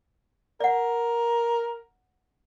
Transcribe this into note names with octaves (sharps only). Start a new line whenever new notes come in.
A#4 D5 F#5